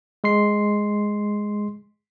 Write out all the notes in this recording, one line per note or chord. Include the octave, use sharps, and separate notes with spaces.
G#3 C6 C7